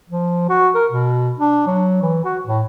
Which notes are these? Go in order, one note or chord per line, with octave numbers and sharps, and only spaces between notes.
F3
F#4
A#4
B2
D4
F#3
E3
F#4
A2